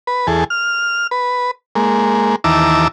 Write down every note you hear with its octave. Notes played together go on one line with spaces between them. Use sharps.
B4
E2 G#4 A4
F6
B4
G#3 A#3
D#2 E3 A5 A#5 D6 E6